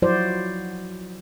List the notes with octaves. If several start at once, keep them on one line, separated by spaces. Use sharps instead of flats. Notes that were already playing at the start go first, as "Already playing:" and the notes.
F3 F#3 E4 F#4 C5 D5